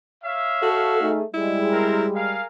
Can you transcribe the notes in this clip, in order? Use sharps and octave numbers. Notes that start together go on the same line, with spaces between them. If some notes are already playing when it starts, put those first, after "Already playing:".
C#5 E5 F5
F#4 A4
A3 D#4 G#4
G3 G#3 E4
C4 A#4
G#4 A#4 F5